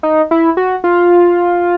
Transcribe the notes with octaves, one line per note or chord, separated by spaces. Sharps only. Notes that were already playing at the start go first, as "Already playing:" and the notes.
D#4
E4
F#4
F4